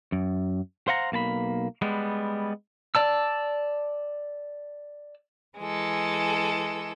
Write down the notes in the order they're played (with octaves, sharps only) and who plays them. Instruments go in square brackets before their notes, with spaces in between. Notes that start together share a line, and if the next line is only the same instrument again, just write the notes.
[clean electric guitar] F#2
C5 F5 F#5 A#5
B1 A#3 A5 B5
G3 G#3 B3
[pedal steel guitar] D5 A5 E6
[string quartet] E3 G#3 A4